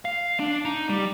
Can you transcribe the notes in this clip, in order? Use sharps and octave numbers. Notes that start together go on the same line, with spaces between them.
F5
D4
D#4
G3